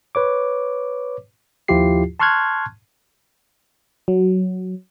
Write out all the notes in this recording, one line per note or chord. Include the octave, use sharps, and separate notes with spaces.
B4 C#5 D6
D#2 F3 E4 F4 G4 C7
A5 C6 C#6 F6 F#6 G#6
F#3